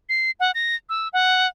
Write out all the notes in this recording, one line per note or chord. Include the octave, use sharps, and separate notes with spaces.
C7
F#5
A#6
E6
F#5